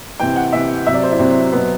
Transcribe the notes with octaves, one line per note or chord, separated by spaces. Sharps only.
C3 E3 G5
F#5
C3 E3 E5
C3 F#3 E5
D5
C5
E4
C3 F#3 C4
B2 F#3 B3